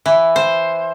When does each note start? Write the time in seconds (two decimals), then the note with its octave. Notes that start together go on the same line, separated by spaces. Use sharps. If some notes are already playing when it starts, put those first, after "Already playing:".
0.06 E3
0.36 C5